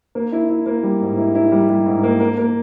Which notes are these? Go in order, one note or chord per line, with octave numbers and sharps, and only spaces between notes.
A#3
E4
E4
A#3
G3
G#2
E4
E4
G3
G3
G#2
A#3
A#3
A#3